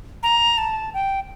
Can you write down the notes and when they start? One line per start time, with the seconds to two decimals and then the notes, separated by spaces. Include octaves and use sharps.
0.23 A#5
0.58 A5
0.94 G5